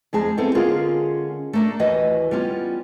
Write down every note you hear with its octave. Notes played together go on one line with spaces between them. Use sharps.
F2 G#3 G#4 A5
B3 C4 E4 A4
D3 G#3 C#4 F4 G#4 A#4
A3 A#3 D4
D#2 E3 F#4 B4 D#5
G3 B3 C#4 F4